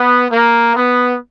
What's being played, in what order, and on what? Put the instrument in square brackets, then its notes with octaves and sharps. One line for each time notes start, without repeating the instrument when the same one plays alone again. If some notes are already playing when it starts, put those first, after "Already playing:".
Already playing: [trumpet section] B3
A#3
B3